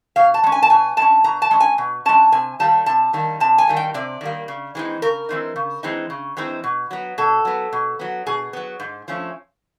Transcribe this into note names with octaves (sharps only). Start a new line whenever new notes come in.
B2 F5
A5
G#3 C#4
G#5
A5
B2 G#5
G#3 C#4 A5
B2 A#5
A5
G#3 C#4
G#5
B2
G#3 C#4 A5
C3 G#5
D#3 G3 A#3 A5
C3 A5
D#3 G3 A#3
C3 A5
G#5
D#3 G3 A#3
G5
C3 D5
D#3 G3 A#3
C#3
E3 G#3 C4 D#4
C#3 A#4
E3 G#3 C4 D#4
C#3
E3 G#3 C4 D#4
C#3
E3 G#3 C4 D#4
B2
F#3 B3
B2 A4
F#3 B3
B2
F#3 B3
B2 G#4
F#3 B3
G#2
F3 A3 C#4